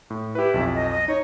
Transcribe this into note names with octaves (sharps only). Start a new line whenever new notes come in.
A2
E4 G4 B4
B1 F2
D#5
D#5
D#4 C#5